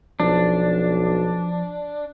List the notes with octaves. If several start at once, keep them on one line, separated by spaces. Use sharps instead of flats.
B1 F3 D4